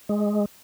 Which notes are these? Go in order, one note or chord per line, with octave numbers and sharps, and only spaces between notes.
G#3